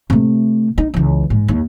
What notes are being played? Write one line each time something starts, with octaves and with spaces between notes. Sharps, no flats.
C3 A3
D#4
C#2 E3
G#2
D#2